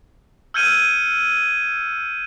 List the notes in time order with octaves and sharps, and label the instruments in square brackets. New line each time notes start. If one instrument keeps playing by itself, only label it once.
[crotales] E6 F6 G6 G#6 C#7 D#7